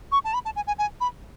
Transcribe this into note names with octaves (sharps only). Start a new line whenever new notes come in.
C#6
A5
B5
A5
G#5
G#5
G#5
B5